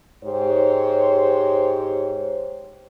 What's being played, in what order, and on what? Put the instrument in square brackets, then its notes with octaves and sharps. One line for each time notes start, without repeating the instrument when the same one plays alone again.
[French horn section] G#2 G4 C5 C#5